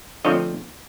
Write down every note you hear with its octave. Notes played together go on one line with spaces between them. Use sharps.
D3 F3 A3 C4 C#5 D#5